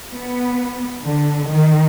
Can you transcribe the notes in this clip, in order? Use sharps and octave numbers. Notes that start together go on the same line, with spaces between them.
B3
D3
D#3